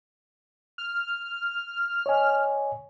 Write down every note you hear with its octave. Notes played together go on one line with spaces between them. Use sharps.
F6
C#5 D#5 G#5